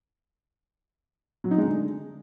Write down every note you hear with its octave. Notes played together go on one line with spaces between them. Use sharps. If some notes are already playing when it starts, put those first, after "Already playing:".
F#3
D#4
G#3
D3